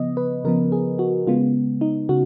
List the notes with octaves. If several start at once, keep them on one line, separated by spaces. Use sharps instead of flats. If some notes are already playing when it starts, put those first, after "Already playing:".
Already playing: C#3 F3 B3 D#5
B4
C#3 F3 B3 A#4
G#4
F#4
C#3 G#3 B3 F4
D#4
C#3 F#4